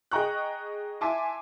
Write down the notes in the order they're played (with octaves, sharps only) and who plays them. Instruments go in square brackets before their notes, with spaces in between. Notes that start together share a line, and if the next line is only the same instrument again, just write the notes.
[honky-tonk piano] G#4 D#5 G5 A#5 C#6 F#6
E5 G#5 A5 C6 D6